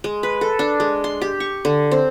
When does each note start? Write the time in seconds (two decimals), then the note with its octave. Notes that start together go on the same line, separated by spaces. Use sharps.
0.04 G#3
0.23 B4
0.41 A4
0.59 D4
0.80 G#3
1.04 C6
1.21 G4
1.40 C#6
1.65 D3
1.91 C4